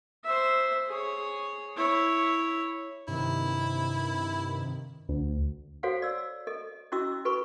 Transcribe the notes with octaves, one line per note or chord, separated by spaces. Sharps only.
C5 E5
G#4 C#5
E4 C#5
G2 C3 D#3 E4
D2
F#4 A4 C5 C#5 F5 F#5
D5 E6
A4 D#5
C#4 E4 F#4 D#5 D6 E6
F#4 A4 B4 B5 C#6